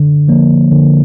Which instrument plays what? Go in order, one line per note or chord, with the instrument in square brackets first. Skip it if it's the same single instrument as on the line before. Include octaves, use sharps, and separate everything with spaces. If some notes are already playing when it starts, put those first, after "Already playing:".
Already playing: [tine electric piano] D3
F3 A#3
D3